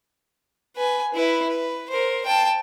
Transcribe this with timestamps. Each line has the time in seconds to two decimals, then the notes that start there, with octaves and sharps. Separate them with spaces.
0.76 B4 G#5
1.14 E4 B4
1.49 B4
1.90 A#4 C5
2.26 G5 A5